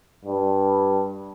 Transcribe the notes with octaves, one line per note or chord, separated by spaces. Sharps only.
G2